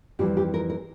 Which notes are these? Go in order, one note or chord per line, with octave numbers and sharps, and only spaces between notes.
F2 E3 G3 G4
G4
A#4
A#4